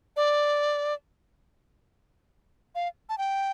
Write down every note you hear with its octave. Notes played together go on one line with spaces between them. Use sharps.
D5
F5
A5
G5